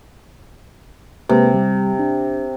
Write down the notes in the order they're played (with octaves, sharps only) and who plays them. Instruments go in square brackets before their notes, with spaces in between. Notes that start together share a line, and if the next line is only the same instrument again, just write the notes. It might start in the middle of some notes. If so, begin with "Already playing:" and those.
[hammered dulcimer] C3 [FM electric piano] G#3 A#3 B4
[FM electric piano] G3
D4